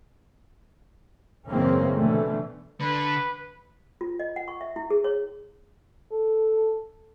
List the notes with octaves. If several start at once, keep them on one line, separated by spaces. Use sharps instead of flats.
F#1 G#2 E3 A#3 C4 C#4
B2 D3 E3 A3
D3 B4
F4
D#5
F#5
C#6
E5
E4
G#4
C#5
A4